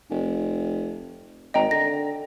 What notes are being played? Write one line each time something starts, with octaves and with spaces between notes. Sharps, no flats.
F1
G#1 D#5 G5 A#5
D3 A#6